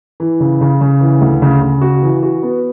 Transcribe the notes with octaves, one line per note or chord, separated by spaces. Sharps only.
E3
C#3
C#3
C#3
E3
D2
C#3
C#3
F#4
E3
F#4
B3